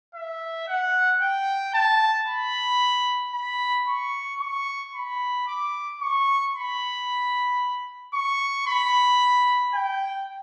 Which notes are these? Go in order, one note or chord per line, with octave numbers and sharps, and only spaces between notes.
E5
F#5
G5
A5
B5
B5
C#6
C#6
B5
D6
C#6
B5
C#6
B5
G5